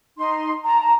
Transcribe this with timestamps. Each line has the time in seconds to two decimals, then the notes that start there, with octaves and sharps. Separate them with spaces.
0.17 D#4 C6
0.64 A5 A#5